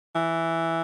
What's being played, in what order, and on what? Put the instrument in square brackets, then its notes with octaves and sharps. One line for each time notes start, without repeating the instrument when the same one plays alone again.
[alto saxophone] E3